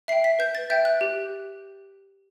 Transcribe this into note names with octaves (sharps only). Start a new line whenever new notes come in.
E5 G5 C7
B6
B4 G6
A6
E5 G5 G6
F#6
G4